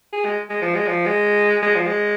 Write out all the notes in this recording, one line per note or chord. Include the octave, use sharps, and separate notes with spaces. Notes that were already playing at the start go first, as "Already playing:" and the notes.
G#4
G#3
G#3
F3
G#3
F3
G#3
G#3
F3
G#3